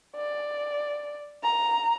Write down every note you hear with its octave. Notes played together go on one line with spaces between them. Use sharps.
D5
A#5